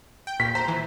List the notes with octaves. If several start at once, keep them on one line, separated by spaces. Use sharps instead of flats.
G5
A#2 B6
C5 A#5
E3